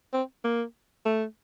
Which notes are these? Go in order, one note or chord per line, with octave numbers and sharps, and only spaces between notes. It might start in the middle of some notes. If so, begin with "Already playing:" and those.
C4
A#3
A3